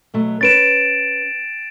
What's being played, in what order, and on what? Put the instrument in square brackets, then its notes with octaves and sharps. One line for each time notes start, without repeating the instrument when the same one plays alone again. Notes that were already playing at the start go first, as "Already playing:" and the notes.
[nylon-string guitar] B2 F#3 A3
[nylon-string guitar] C#4 B4 [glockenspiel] A6 D7 E7